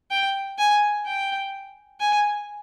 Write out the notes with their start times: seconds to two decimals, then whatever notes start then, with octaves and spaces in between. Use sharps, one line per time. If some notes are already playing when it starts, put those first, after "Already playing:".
0.11 G5
0.58 G#5
1.06 G5
2.00 G#5